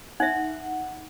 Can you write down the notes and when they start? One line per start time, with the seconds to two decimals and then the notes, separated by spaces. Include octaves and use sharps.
0.20 D#4 E5 F#5